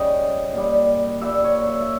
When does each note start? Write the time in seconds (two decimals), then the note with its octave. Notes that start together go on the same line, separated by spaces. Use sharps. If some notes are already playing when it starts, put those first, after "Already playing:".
Already playing: C#3 G3 D#5 G5
0.53 A#2 G3
1.21 A#2 G3 E5
1.44 C#5
1.67 E5
1.81 E5